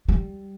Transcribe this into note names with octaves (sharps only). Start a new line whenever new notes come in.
G3